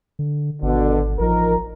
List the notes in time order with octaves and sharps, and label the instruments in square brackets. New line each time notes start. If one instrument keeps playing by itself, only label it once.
[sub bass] D3
[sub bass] G#1 [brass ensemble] B2 D3
[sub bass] A1 [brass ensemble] F3 D#4 A#4